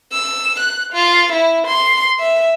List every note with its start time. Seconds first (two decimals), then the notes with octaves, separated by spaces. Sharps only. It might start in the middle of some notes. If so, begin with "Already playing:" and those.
0.12 E6
0.60 F#6
0.93 F4
1.32 E4
1.67 C6
2.19 E5